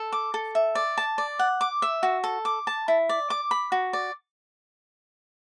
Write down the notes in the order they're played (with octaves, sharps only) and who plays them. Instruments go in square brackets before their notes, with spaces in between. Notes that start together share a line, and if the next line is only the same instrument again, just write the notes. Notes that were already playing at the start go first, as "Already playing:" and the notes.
Already playing: [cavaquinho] A4
D6
A4
E5
D5
A5
D5
F#5
D6
E5
F#4
A4
D6
A5
E4
D5
D6
B5
F#4
D5